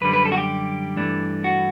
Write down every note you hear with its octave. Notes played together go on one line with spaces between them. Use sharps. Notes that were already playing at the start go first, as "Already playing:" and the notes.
F#2 D3 G3 B4
B4
A4
F#4
G4
G2 E3 A3 D4
F#4